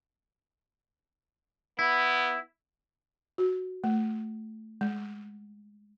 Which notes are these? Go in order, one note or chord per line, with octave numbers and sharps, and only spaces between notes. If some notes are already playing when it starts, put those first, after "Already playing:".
B3 E4
F#4
A3
G#3